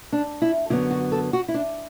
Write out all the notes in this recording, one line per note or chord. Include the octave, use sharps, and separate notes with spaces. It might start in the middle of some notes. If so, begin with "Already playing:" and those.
D4
E4
F#2 D3 F#3 B3 E4
F#4
A4
F#4
E4
D4